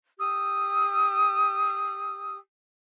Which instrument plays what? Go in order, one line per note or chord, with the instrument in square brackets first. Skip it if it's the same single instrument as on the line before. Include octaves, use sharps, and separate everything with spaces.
[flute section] G4 D#6 E6